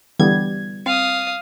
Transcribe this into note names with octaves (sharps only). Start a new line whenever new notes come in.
D3 E3 G3 B3 G#6
C4 F5 D#6